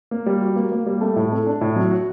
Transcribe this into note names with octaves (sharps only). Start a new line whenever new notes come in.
A#3
G3
F#4
A#3
A#3
G3
A3
A2
A3
D4
A2
F#3
F#4